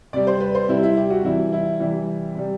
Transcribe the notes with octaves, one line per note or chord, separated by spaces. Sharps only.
C3 G3 D5
C5
B4
C5
C3 G3 E4
E4
G4
F#4
C3 E3 G3 E4
E4
C3 E3 G3
C3 G3